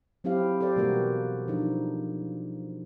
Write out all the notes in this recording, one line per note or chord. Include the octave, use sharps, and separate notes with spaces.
F#3 C4 E4 G4 F5
G4 A4 C5 D5
B2 E3 G3 A#3 F#4 A#4
F3 D4 D#4